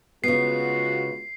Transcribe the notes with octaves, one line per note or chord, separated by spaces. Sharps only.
C#3 G#3 B3 F4 F#4 C7